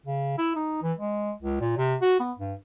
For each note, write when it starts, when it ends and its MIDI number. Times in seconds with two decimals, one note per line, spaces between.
0.06 0.34 49
0.38 0.51 64
0.56 0.82 63
0.83 0.93 52
0.99 1.32 56
1.42 1.59 37
1.61 1.76 46
1.78 1.96 48
2.01 2.18 66
2.20 2.32 59
2.39 2.54 43